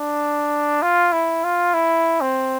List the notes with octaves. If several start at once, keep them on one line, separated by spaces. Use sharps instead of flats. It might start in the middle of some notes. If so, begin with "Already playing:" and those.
Already playing: D4
F4
E4
F4
E4
C4